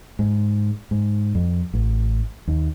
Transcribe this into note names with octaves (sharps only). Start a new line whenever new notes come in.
G#2
G#2
F2
A1
D#2